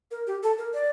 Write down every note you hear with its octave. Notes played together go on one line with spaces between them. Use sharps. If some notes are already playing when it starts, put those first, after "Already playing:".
A#4
G4
A4
A#4
D5